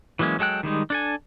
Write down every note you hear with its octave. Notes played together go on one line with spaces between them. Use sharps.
E3 F#3 G#3 A#3 C#4
F#3 G#3 A4 G5 F#6
D#3 G3 G#3 D#4
D4 A4 G#5